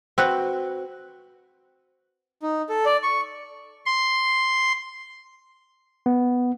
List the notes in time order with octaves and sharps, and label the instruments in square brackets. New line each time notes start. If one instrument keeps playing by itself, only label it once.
[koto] C4 F#4 B4
[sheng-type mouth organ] D#4
A4
D5
C#6
[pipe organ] C6
[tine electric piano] B3